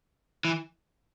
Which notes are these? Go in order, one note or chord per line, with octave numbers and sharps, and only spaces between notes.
E3